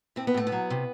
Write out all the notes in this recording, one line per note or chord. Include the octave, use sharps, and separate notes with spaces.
A2 C4
B3
A2 A3
B3
F#3
C3